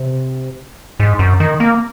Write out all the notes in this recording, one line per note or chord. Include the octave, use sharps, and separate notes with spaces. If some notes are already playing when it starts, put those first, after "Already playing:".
Already playing: C3
G#2
F#2
D#3
A#3